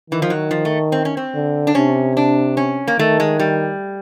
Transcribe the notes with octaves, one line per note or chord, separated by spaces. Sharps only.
D#3 E3
F3
F#3
F3
A3
C4
C#4
C4
D3
D4
C3 C#4
D4
C#4
A#3
D#3 A3
G#3
G3